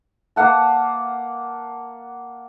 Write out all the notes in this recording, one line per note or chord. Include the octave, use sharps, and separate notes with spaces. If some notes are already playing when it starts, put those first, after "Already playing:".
A#3 F5 F#5 A5